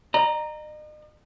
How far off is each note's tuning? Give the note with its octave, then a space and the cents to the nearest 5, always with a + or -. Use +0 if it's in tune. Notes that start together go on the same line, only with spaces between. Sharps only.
D#5 -40 A#5 +0